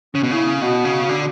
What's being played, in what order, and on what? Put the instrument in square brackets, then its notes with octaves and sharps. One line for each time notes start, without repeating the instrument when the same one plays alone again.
[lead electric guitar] C#3 [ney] C#4
[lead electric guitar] B2
[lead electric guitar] C#3 [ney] E4
[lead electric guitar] B2 [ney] F#4
[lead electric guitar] C#3
D3